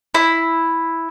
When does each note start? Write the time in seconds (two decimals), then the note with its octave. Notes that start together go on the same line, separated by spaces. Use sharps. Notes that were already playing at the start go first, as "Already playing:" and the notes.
0.14 E4